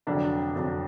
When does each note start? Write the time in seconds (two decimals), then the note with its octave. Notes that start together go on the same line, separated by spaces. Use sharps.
0.07 F1 F2 D3 F#3 D4
0.56 F1 F2 D3 F#3